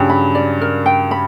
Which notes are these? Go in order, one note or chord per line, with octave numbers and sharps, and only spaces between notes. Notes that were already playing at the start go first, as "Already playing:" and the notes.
Already playing: G2 C#3 F#3 G3 G5
B5
D5
A#4
G5
B5